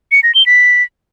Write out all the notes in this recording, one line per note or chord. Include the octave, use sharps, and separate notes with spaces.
C#7
A#6
G7
B6